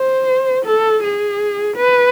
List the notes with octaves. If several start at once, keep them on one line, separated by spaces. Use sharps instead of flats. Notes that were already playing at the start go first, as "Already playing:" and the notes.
Already playing: C5
A4
G#4
B4